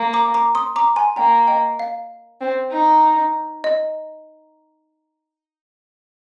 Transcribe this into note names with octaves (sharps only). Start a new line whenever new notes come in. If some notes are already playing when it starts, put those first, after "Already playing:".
Already playing: A#3
A#5 D6
A#5 D6
C6 D#6
A#5 D6
G#5 C6
A#3 G5 A#5
D#5 G5
F5
C4
D#4
D#5